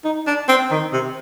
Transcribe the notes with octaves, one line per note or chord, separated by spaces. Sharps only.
D#4
D4
C4
D#3
C3